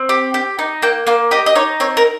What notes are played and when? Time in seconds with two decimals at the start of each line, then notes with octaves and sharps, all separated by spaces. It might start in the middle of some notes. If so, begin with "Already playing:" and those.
Already playing: C4
0.09 G4
0.34 G4
0.59 D#4
0.82 A#3 G5
1.07 A#3 F5
1.31 G4 D#5
1.46 D#5
1.55 D#4 C#5
1.80 C4 C#5
1.97 A#4